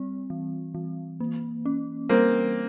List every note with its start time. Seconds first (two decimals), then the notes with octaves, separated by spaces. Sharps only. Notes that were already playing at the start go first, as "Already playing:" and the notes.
Already playing: G3 C4
0.30 E3
0.75 E3
1.20 A#3
1.66 C#4
2.09 G3 A#3 C4